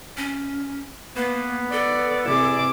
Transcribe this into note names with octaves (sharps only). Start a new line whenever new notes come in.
C#4
A#3 B3
A4 D5
C3 E3 E4 G#4 D5 D6